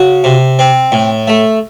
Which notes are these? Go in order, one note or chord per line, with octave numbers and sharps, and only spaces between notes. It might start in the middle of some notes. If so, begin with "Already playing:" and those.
Already playing: C#3 F#4
C3
C4
A2
A3